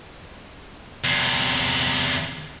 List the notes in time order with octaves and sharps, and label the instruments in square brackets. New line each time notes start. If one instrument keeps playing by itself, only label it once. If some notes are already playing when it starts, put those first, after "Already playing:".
[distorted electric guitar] E2 C3